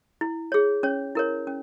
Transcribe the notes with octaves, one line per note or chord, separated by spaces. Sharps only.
E4
G#4 C#5
C#4 C#5
E4 A#4 C#5
C#4